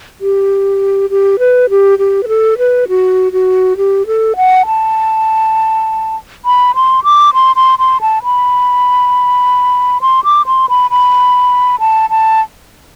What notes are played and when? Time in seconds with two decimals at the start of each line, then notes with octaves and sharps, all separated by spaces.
0.21 G4
1.10 G4
1.39 B4
1.70 G4
1.99 G4
2.23 B4
2.28 A4
2.58 B4
2.88 F#4
3.32 F#4
3.77 G4
4.07 A4
4.36 F#5
4.66 A5
6.45 B5
6.75 C6
7.04 D6
7.34 C6
7.56 C6
7.79 C6
8.01 A5
8.24 B5
10.01 C6
10.24 D6
10.46 C6
10.69 B5
10.91 B5
11.80 A5
12.10 A5